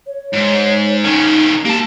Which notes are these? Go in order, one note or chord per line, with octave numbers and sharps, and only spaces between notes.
C#5
G#2
D#3 C#4 D#4
A#3 G4 A5